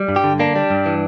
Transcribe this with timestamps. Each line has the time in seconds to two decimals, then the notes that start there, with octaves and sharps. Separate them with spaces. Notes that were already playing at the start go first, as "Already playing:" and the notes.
Already playing: G3
0.09 G2
0.16 G4
0.24 D3
0.40 A#3 D4
0.56 G3
0.70 G2
0.86 E3